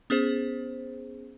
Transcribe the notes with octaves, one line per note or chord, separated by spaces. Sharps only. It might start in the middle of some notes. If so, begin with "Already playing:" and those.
B3 C#4 G#4 C5